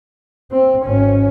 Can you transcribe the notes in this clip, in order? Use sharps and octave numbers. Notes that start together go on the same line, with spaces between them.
C4
G#1 C#4